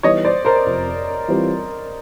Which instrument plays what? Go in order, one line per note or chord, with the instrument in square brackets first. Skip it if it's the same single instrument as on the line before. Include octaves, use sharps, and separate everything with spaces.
[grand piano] E3 G3 B3 D#4 [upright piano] C#5 D#5
[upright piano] C5 D5
A#4 C5
[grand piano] F2 C3 F3
E3 G3 C4 F4